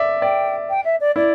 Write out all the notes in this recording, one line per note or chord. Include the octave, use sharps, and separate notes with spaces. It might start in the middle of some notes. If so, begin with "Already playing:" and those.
Already playing: D5 E5
D5 G5
G5
E5
D5
E4 D5